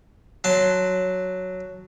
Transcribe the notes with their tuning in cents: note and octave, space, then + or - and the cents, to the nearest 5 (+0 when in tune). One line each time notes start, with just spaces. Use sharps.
F#3 +0 A5 +0 C6 +0